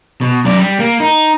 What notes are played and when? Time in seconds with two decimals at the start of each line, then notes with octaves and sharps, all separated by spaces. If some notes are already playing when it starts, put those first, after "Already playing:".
0.21 B2
0.45 F#2 D5
0.58 G3
0.80 A#3
1.00 D#4